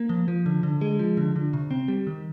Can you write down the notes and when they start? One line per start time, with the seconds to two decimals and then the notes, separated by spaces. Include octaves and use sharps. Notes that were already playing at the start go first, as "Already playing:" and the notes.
Already playing: A#3
0.09 F3
0.28 F3
0.46 D3
0.63 D3
0.81 G#3
0.99 F3
1.17 D3
1.36 D3
1.53 C3
1.71 C4
1.88 G3
2.07 D#3